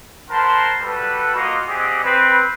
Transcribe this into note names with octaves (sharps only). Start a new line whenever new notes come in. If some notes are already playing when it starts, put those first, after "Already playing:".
A#4 C5 F#5 A5 B5 C6
G3 F#4 A4 B4
A#3 F4 F#4 D#5
C4 G4 G#4 D5 D#5 F#5
C4 B4